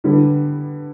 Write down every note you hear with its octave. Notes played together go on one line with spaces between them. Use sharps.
D3 G3 B3